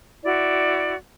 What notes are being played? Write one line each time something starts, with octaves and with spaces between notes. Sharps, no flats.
E4 F#4 D5